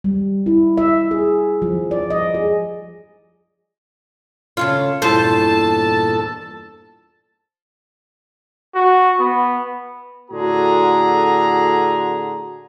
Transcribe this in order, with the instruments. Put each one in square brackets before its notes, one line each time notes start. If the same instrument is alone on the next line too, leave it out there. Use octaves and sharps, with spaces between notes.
[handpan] G3
E4
E5
G#4
F3
D5
D#5
G#4
[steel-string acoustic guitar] C#3 A4 C#5 [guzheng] F4
[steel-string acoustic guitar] E2 G2 A#2 [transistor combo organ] A4 [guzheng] C5 [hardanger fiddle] A5
[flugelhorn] F#4
B3
[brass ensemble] A2 D3 F#4 G#4 A#5